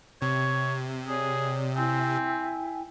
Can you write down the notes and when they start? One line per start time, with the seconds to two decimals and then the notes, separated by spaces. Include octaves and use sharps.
0.22 C3 C#5
1.08 G#4 C#5 D5
1.76 C4 E4 G5 G#5